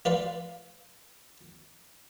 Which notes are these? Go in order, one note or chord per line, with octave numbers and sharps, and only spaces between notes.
F4 B4 D5 F5